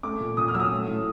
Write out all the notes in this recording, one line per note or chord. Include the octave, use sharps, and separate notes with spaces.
A3 D6
A#2
A#2 D#6
F6
F#3 E6
D#6
A3
A2